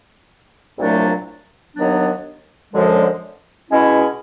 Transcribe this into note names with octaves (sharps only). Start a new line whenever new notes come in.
C2 A#2 F#3 A3 D4
D#2 D#3 F#3 B3 D4
F#2 D3 F3 G#3
B2 G#3 C#4 E4